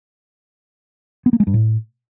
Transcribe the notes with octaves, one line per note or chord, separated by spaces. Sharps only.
B3
A#3
G#3
G2
A2